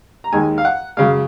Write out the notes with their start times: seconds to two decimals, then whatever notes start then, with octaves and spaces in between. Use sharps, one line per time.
0.24 A#5
0.32 D#2 D#3 G#3 G#5
0.58 F5
0.65 F#5
0.97 F#2 C#3 G#3 F5